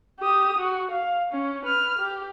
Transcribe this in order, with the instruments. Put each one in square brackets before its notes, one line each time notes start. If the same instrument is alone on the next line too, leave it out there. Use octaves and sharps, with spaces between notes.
[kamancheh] G4 D#6
F#4
F5
C#4
B4 F6
G4